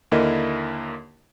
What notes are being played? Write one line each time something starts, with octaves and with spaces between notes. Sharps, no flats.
D#2 D3 A#3 E4 A#4 D#5